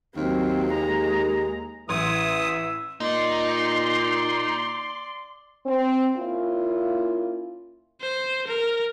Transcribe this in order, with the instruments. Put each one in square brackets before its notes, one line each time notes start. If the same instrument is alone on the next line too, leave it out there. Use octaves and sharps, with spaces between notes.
[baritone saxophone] D#2 [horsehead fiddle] F#3 C4
[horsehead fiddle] G#3 A#5
[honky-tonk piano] A1 C6 G#6 [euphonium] E3 [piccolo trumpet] E5 [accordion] D#6
[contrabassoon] A#2 [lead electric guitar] D#4 [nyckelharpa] D5 [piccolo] C6
[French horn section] C4
A#3 C#4 E4 F4
[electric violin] C5
A#4